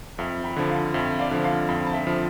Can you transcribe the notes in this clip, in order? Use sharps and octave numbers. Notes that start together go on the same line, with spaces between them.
F2 E5 G5
G5 B5
D3 F3
F5 A5
F2 E5 G5
D5 F5
D3 F3
F5 A5
F2 G5 B5
A5
E5 G5
D3 F3